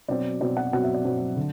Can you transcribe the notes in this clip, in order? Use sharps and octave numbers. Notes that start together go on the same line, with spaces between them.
B2 F#3 C4 D5
B2 F#3 C4 D5
F#5
B2 F#3 C4 F#5
E5
D5
B2 F#3 C4
D3